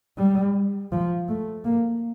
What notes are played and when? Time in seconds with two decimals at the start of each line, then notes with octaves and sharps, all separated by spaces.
0.17 G3
0.92 F3
1.29 A3
1.65 A#3